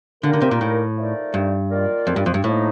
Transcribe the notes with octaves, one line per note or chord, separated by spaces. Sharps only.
D3 G3 A#3 D#4 A#4
D3
C3
A#2
A2
F3 A3 D#4 A#4 D5
G2
D#3 A#3 F4 A#4 D5
F2
G2
F2
G2
A2 F3 A#3 D#4